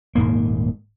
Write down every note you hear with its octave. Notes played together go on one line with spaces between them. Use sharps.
D#1 G#2 A#3